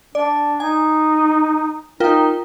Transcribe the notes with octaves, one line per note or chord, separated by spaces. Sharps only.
D4 D5
D#4 G#5
D#4 F4 A#4 G5